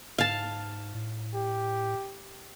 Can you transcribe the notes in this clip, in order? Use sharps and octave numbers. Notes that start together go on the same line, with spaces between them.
G#2 F5 A5
A2
G4